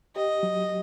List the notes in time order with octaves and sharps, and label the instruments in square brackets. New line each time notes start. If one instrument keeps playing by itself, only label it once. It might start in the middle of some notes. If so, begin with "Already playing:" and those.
[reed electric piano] G4 [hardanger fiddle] D#5
[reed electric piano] F#3